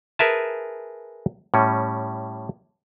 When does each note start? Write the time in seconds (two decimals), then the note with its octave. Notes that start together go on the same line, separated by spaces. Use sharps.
0.19 G#4 A#4 B4 E5 G#5 A5
1.54 A2 G3 C#4